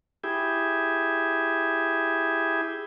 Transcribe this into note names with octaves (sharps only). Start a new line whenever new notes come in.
E4 G4 G#4